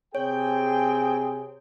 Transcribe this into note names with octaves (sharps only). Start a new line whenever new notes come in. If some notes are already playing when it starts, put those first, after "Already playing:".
C3 C4 G#4 C#5 G5